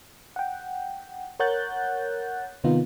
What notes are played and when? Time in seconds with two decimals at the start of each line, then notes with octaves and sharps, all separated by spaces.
0.36 F#5 G5
1.40 A#4 C#5 F#5 F#6 G6 A6
2.64 C3 D#3 B3 D#4 F4